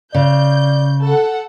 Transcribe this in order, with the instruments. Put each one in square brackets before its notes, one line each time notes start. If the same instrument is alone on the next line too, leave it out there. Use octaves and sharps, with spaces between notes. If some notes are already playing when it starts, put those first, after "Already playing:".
[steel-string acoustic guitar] C#3 [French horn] D5 [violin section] G6
[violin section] A4 F#5